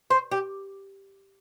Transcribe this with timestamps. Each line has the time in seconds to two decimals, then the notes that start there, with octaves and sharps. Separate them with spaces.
0.10 C5
0.31 G4